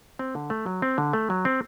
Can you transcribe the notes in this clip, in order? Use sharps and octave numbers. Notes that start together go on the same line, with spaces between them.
C4
D3
A3
F#3
C4
D3
A3
F#3
C4